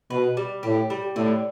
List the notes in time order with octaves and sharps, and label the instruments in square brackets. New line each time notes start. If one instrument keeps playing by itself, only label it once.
[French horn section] B2 [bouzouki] B4
[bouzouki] G3
[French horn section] A2 [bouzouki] G4
[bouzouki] G3
[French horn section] A2 [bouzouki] D3